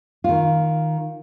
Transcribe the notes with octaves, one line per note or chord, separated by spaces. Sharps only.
D#3 F4